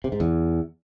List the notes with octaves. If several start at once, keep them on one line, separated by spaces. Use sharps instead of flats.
C3
G#2
E2